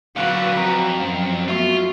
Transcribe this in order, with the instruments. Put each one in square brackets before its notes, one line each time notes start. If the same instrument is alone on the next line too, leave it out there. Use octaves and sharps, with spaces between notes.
[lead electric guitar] A#2 D3 [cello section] F#3 F#4 B4 [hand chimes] F5 F#6 D7
[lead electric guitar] F2 [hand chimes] A#5
[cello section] F#2
[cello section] A3 B3 [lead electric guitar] F4 [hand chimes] F#4 E5 C#6